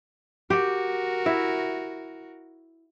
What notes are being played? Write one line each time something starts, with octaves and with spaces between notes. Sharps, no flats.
F#4 G4 A#4
E4